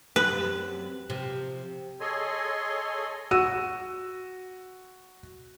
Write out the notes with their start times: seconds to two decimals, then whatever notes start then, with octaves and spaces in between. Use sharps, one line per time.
0.16 F#2 C3 B4
1.10 C3 F3
2.00 G#4 A4 C#5 D#5 G#5 C6
3.31 F#4 E6 D#7